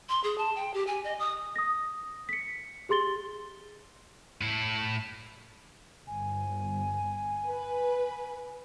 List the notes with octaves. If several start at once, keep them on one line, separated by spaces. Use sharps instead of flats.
C6
G#4
A5
G5
G4
G#5
D#5
D#6
D#6 A#6
B6 C#7
G4 G#4 C6 A6 G7
A2 E4
G1 G#5
B4